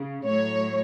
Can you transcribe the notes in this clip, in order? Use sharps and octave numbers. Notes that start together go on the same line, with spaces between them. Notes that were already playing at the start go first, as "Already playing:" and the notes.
Already playing: C#3
A2 F#3 C#5